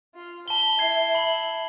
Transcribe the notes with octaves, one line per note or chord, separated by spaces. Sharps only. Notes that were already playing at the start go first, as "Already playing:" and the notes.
F4
A5 B5 G7
E4 E5 G#6 C7
B5 F#7